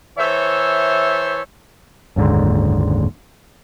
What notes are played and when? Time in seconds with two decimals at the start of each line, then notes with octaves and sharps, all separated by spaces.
0.18 E3 A4 C5 C#5 E5
2.16 F#1 D#2 G#2 D3